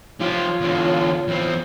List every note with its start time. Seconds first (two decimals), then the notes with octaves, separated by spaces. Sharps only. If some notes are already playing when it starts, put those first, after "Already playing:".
0.20 F3 F4 G4 C#5
0.61 E2 D3
1.28 E2 C4